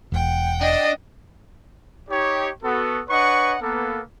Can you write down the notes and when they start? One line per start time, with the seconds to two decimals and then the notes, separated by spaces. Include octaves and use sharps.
0.12 E1 F#5 G5
0.61 D4 D#5
2.10 D#4 G4 C#5
2.63 B3 F#4 A4
3.09 D4 B4 C#5 D#5 F#5 C#6
3.62 A#3 B3 A4